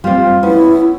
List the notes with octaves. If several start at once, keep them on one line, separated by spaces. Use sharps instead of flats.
G3 C4 F4
B3 C#4 E4